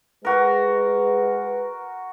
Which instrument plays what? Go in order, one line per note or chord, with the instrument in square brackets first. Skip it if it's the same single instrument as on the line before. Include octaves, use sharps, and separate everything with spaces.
[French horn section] G#3 B4 [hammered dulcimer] F#4 A#4